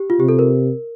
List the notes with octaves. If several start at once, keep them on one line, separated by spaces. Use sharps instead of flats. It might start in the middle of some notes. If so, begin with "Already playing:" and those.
Already playing: G4
F4
C3 G4
A4
A#4